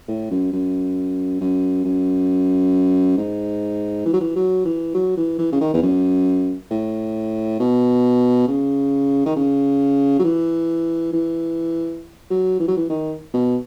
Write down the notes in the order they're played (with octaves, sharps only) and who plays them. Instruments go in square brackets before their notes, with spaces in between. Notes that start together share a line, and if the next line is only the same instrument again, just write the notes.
[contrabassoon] A2
F#2
F#2
F#2
F#2
G#2
E3
F#3
E3
F#3
E3
F#3
E3
E3
C#3
D#3
E2
F#2
A2
B2
C#3
D#3
C#3
F#3
E3
E3
F#3
E3
F#3
E3
D#3
B2